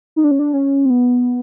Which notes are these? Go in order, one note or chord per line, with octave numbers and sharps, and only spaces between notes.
D#4
D4
C#4
D4
C#4
C4
B3